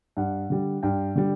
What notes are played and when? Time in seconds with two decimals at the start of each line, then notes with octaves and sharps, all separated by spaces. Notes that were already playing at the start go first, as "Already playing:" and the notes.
0.17 G2 F#5
0.50 D3 G3
0.83 G2 G5
1.16 D3 G3